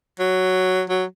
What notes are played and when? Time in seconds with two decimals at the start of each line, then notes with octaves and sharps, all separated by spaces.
0.19 F#3
0.89 F#3